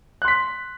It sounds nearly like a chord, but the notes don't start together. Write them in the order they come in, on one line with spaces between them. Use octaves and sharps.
F#6 C6 B6